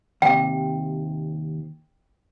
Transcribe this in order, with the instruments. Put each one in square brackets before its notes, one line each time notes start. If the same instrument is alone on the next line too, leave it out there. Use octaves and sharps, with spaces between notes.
[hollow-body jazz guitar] D#2 A2 C3 [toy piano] G5